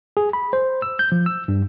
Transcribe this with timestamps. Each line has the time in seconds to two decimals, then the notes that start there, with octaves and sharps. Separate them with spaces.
0.17 G#4
0.33 B5
0.53 C5
0.82 E6
0.99 G6
1.12 F3
1.26 E6
1.48 G2